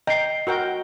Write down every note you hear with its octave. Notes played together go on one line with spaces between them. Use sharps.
D#5 G5 A#5 C7
F#4 A#4 G5